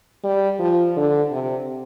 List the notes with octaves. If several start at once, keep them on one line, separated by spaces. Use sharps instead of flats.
G3
F3
D3
C3